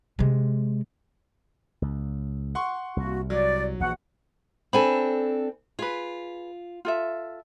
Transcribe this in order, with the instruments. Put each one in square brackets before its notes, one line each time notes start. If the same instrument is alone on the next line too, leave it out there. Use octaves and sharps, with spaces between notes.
[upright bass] C3 G#3
[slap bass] C#2
[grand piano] F#5 C6 C#6
[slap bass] C2 [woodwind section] A#3 F#4
[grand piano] F#3 [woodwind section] D5
[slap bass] A#1 [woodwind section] E3 F#4 F#5
[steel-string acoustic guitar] C4 D4 A4 [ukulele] G#5 B5
[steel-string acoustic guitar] F4 [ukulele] G#4 B4
[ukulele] F4 A4 E5